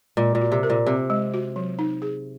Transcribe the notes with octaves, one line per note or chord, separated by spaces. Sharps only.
A#2 G#3
A#2
F#4
C3
A#4
A#2
C3 C4
G#3
F#4
F#3
D#4
G#4